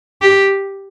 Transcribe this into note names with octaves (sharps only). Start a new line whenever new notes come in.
G4